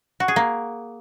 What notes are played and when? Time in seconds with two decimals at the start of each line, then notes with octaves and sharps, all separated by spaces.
0.20 F#4
0.28 G#4
0.36 A#3